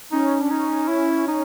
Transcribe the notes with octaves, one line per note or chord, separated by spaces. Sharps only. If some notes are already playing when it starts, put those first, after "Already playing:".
C#4 D#4
D4
D#4
E4
D#4